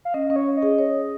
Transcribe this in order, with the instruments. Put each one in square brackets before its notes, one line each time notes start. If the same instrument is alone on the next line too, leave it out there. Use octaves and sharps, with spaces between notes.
[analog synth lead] F5
[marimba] C#4 [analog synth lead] D#5
[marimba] C#4 [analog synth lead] D#5
[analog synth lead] C#5
D#5
[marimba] G#4
C#5